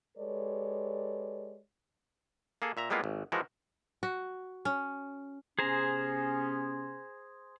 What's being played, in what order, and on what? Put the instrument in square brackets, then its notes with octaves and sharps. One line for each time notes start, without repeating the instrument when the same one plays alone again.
[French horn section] G#3 G4 A4 B4 C#5 D5
[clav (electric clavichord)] A#3 G#4 A4
A#2 E5 A#5
G3 G#3 A#3 B3 E4 F4
G#1
E3 F3 G#3 F#4 A#4
[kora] F#4
C#4
[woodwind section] C3 B3 C#4 [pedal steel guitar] G#4 C5 A#5